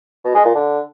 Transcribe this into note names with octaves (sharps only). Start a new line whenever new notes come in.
B2
G#3
A#2
D3